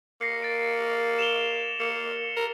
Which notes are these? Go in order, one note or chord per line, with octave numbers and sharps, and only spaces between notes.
A#3 A#6 C7 C#7
A6 D7
E7 F7 G7
A#3 C#7
A#4